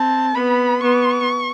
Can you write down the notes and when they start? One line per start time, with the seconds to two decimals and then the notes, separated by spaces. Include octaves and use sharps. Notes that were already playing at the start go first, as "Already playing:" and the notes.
Already playing: C4 A5
0.35 B3 B5
0.81 B3 C#6